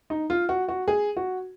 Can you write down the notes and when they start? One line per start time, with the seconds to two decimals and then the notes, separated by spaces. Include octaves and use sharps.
0.10 D#4
0.30 F4
0.49 F#4
0.68 F#4
0.88 G#4
1.17 F#4